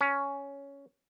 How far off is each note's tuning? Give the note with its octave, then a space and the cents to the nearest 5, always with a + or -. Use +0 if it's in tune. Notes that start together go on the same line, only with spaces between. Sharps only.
C#4 +10